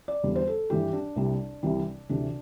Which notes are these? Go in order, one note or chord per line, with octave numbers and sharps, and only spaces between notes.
D5
E2 D3 G3
C5
A4
G2 E3 G3 G4
D4
C2 C3 G3
C2 C3 E3 G3
D2 C3 E3 D4